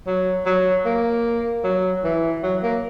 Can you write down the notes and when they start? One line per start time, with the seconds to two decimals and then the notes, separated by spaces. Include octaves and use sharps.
0.07 F#3
0.46 F#3
0.85 A#3
1.64 F#3
2.04 E3
2.43 F#3
2.63 A#3